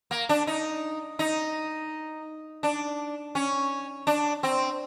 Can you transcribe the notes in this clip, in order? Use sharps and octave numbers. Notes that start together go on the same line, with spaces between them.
A#3
D4
D#4
D#4
D4
C#4
D4
C4